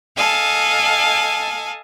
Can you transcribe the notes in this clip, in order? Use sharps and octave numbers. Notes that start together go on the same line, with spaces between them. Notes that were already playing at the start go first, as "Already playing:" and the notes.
A4 D#5 F5 G#5 A5